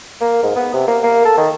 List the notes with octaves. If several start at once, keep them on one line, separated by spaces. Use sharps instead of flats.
A#3
G#2
B3
C3
A#3
A#3
A4
D#3